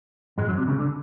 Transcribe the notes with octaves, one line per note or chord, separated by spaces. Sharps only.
G#2 G#3
F#2 F#3
C2 C3
C#2 C#3
D3